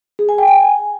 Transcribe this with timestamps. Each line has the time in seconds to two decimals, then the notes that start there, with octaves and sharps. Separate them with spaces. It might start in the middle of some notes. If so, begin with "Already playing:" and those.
0.19 G#4
0.29 G#5
0.38 G5
0.48 G#5